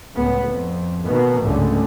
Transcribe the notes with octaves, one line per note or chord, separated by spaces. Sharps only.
C#2 A2 B3
F2
B2 D#3 A#3 B3
G#1 C#2 G2 D3 A3